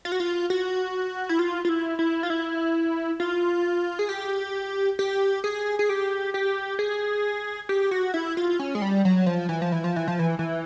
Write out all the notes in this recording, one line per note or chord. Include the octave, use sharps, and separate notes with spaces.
F4
F#4
F4
F#4
E4
F4
F4
E4
E4
F4
E4
F4
G#4
G4
G4
G#4
G#4
G4
G4
G#4
G4
F#4
E4
F4
C#4
G#3
G3
F#3
F3
E3
F3
E3
F3
E3
F3
E3
E3